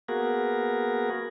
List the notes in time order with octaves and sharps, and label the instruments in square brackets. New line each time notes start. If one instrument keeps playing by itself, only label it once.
[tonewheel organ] A#3 B3 F#4 G#4 A#4